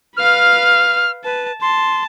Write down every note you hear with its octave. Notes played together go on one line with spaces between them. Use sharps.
B4 F5 F6
B4 A5
A5 C6